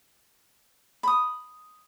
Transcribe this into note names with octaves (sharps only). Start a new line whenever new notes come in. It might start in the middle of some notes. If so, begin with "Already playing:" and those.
B5 D#6